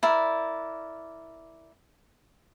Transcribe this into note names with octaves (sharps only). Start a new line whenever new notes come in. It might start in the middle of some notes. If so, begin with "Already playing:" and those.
E4 A#4 D5